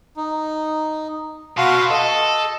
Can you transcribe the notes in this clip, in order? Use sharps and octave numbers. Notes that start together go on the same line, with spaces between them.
D#4
B2 F#4 F5 C6
A4 D#5